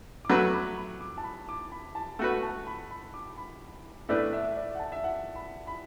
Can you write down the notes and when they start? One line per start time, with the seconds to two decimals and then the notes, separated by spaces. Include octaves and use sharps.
0.25 D6
0.30 F#3 A3 F#4 B4 B5
0.49 D6
0.54 B5
0.77 B5
1.01 D6
1.18 A5
1.24 B5
1.49 D6
1.72 B5
1.95 A5
2.19 A3 F#4 B4 F#5
2.43 A5
2.67 B5
2.91 B5
3.14 D6
3.38 B5
4.09 A2 A3 D4 B4 D5
4.33 E5
4.57 D5
4.75 F#5
4.79 A5
4.92 E5
5.04 F#5
5.36 B5
5.67 B5